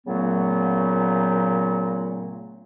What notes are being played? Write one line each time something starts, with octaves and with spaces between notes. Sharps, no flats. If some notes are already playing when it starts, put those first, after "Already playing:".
A#2 C#3 F#3 A3 B3